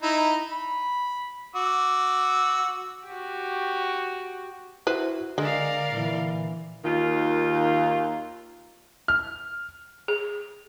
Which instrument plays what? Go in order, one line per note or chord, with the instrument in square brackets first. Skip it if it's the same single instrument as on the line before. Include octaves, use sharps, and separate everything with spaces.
[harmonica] D#4 E4
B5
F#4 D6 E6
[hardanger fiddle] F#4 G4
[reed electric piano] E4 F#4 [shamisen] B4 C5
[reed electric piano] D3 [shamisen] G#3 [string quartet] A#4 D5 F5
[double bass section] A#2 E3
[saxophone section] D#2 D#3 F4
[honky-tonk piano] F6
[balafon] G#4